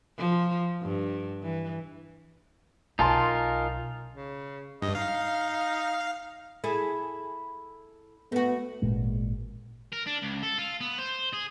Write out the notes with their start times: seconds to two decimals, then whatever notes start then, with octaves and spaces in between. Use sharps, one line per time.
0.18 F3
0.82 G2
1.43 E3
2.99 B1 D#4 F4 A#4 G#5 A5 C6
4.12 C#3
4.82 G2 D#5
4.95 D#4 F5
6.64 E4 G#4 A4
8.32 A3 B3 F#4
8.82 G#1 A#2 G#3
9.93 A#4
10.07 D4
10.22 C#2
10.43 A4
10.58 F4
10.81 B3
10.98 C5
11.33 G#4